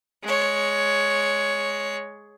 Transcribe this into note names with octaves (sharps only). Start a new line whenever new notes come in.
G#3 C#5